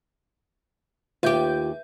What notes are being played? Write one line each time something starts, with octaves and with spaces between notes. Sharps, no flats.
D#2 F4 G4 B4 E5 G6